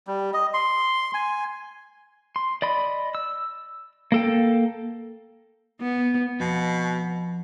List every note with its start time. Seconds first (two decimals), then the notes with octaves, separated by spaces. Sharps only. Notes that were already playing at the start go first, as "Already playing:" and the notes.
0.07 G3
0.33 D#5
0.54 C6
1.14 G#5
2.36 C6
2.62 D5 D#5 B5
3.15 E6
4.12 A#3 A4 G5
5.81 B3
6.40 F2 B2